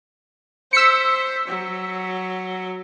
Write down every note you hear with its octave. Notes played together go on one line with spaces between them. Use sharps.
C5 E6 B6 C#7
F#3